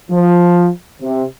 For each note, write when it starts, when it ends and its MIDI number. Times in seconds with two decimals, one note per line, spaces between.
0.11 0.68 53
1.02 1.24 48